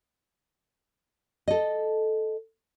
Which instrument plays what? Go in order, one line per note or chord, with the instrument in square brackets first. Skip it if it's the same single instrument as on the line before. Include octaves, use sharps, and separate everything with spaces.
[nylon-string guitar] A4 D#5